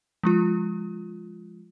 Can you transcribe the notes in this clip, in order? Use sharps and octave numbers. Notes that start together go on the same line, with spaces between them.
F3 G#3 F4